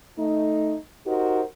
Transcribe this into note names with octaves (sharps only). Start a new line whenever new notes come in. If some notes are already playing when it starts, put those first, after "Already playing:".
A3 D#4
D#4 F#4 G4 A#4 C5